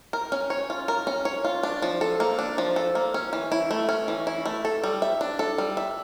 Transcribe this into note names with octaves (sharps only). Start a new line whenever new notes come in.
A#4
C#4
C#5
F4
A#4
C#4
C#5
F4
D4
F3
A4
A#3
D4
F3
A4
A#3
C#4
E3
E4
A3
C#4
E3
E4
A3
A4
G3
E5
D4
A4
G3
E5